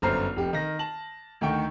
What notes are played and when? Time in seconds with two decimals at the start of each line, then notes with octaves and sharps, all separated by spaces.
0.02 G1 F#2 C5 A#5 F6 C7
0.36 F1 G4
0.53 D#3 A#6
0.79 A5 F#7
1.41 D2 D#3 A3 G5 C#6